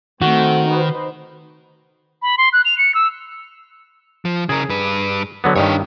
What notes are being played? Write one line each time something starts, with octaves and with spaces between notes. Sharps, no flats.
D#3 A3 C4 F#4
D#4 B4 C5
B5
C6
F#6
F7
C#7
E6
F3
C#3 G#4 A#4
G2 B4
D3 F#3 B3
G2 D#3 D4 C#5